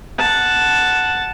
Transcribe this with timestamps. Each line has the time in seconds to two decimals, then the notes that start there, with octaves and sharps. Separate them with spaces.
0.18 F#5 A5